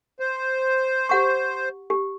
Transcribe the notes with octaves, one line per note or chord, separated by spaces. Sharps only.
C5
G4 F#5 C#6
G4